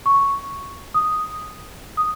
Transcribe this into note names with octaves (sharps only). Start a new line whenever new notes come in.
C#6
D#6
D#6